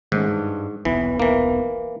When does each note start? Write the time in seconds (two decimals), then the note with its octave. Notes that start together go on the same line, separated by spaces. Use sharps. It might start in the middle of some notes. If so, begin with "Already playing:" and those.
0.12 G#2 D#3 A3 C#4
0.28 G2
0.85 D#1 B1 E3 B3
1.20 E3 A#3